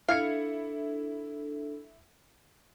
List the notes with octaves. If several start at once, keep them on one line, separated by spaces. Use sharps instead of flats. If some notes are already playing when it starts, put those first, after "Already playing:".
D4 E4 A4 F5 G#6 C#7